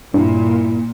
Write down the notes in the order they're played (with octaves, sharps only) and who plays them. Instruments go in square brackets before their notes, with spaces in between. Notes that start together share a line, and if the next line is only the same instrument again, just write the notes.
[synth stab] G2 [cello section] A#2 [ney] E4